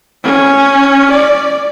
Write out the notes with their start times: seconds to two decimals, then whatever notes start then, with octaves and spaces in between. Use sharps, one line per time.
0.23 C#4
1.11 D5